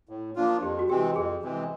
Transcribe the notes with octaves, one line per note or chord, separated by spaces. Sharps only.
A2
F3 A#3 D4 F4
F2 G4
F#4
C3 E3 G#3 C4 G4
F2 G#4
C3 E3 G#3 C4